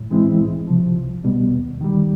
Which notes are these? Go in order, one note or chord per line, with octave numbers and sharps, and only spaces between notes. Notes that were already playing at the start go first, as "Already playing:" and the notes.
Already playing: A2
E3 G#3 C4 E4
C2
C3 F3
C2
B2 G3 B3
D#2
D#3 G3